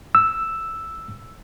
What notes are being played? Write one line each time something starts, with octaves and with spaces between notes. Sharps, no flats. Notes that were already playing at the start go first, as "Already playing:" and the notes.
E6